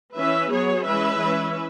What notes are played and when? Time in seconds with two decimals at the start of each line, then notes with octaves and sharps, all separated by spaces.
0.16 E3 C#4 B4 E5
0.50 F#3 B3 G#4 C#5
0.84 E3 G#3 C#4 B4 E5
1.18 E3 C#4